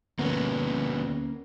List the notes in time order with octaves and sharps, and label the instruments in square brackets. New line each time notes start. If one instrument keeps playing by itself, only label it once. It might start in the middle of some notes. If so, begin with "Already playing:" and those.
[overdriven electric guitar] D2 B3 [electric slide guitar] A#3 C#4 A#4